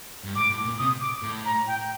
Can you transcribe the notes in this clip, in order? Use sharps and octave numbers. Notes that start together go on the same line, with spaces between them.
G2
A2 D6
A2
A#2
C3 D#6
D6
A2
A#5
G5